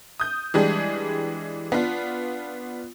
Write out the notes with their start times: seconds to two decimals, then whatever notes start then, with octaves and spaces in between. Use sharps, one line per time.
0.20 D#6 G6
0.54 E3 G3 G#3 D4 G#4
1.72 B3 D4 F4